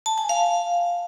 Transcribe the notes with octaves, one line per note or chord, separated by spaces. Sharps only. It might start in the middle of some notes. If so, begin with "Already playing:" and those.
A5
G#5
F5